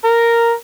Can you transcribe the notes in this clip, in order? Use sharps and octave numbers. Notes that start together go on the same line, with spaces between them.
A#4